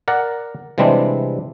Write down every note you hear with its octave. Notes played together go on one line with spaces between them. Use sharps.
A#4 D5 F#5
C3 E3 G3 G#3 C4 D4